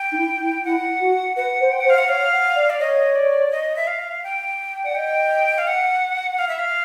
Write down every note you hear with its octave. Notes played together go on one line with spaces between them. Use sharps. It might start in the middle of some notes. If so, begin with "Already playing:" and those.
Already playing: G5
D#4
E4
E4
E4 F#5
F#4
B4 F#5
C5
G5
F#5
C5
F5
F#5
C#5 F5
F#5
D5
D5
C#5 D#5
D5
D#5
E5
F5
G5
D5 F#5
D#5 G5
F5
F#5
F5
E5
F5